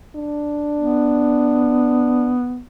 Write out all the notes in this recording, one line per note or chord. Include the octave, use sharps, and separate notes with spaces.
D4
B3